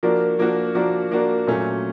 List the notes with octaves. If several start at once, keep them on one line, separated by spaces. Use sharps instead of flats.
F3 A#3 D4 F#4 A#4
F3 A#3 D4 F#4 A#4
F3 A#3 D4 F#4 A#4
F3 A#3 D4 F#4 A#4
A#2 F#3 A3 C#4